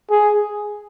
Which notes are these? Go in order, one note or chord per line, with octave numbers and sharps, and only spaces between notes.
G#4